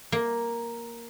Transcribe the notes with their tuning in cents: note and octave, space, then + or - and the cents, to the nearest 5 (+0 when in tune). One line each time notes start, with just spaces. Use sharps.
A#3 +5